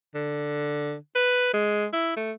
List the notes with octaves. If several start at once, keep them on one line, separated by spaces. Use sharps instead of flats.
D3
B4
G#3
E4
A3